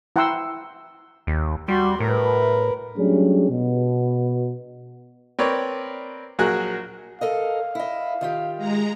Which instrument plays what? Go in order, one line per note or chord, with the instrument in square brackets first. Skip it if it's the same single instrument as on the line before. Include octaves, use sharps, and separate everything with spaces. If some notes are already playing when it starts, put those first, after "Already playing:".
[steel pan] E4 F#5 G5 A#5 C6 E6
[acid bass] D#2
[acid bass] G3 [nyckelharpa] F#4 C6
[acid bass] A2 [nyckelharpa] A#4 B4
[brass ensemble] F#3 G3 A3 C#4 D4 G#4
B2
[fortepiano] C4 A#4 B4 C#5 D5
A#1 F#3 F#4 G#4 A#4 F#6
[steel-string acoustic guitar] A4 A#4 D#5 [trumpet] F5
[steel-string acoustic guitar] E4 D#5
D#3 F4 G4
[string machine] G#3 A#5